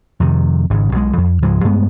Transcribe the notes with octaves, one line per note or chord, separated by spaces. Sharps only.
F2 C3 D#3
G#1 G#2 C#3
B1 B2 G#3
F2
C#2 G#2 F3 G#3
G2 G#3 A3 B3